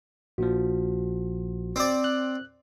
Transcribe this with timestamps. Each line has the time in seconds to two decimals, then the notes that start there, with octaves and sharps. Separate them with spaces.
0.38 A#1 A#2 F3 F#4
1.76 C4 D5
2.04 F#6